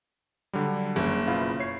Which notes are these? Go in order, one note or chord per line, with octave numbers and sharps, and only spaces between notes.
D3 F#3 G3
F#1
B2 E4 F4
C#5 C7